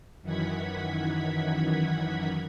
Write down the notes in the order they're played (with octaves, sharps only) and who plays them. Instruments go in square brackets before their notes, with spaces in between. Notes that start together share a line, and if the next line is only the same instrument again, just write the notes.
[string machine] F#2 D#3 E3 F#5 G#6 B6